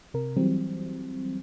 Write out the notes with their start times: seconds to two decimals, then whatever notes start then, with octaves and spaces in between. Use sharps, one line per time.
0.14 C3 A#4
0.37 E3 F#3 G3 C4